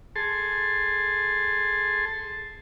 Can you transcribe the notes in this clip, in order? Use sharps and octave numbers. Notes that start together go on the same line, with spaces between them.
G#4 A4 A5 C6